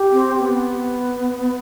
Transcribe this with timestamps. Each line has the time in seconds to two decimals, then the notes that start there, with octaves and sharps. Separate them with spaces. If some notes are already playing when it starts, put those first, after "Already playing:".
Already playing: G4
0.12 C4
0.39 B3